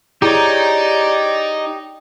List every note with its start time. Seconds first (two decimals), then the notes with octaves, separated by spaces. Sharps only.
0.22 D#4 E4 G4 G#4 C#5 D5 A#5